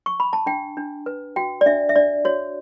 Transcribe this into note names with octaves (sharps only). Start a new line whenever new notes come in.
C#6
B5
A5
D4 G5
D4
B4
F#4 G5
D5
D4 E5
E5
D4 D5
F#4 C#5